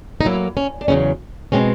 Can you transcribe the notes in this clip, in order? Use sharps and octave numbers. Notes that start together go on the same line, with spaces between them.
D#4
A2 F#3 A#3 E4
C#4
D4
E2 C#3 F#3 C#4
B2 G#3 C4 C#4